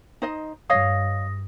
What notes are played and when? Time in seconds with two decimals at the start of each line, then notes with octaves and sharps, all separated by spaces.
0.22 D#4 C5 D#5
0.70 G2 C#5 D#5 F5 D#6 A#6